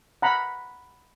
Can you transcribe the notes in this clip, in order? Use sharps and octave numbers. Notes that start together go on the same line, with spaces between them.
F#5 A#5 B5